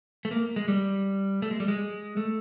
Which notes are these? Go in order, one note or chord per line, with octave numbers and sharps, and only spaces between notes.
A3
A#3
G#3
G3
A3
G#3
G3
G#3
A3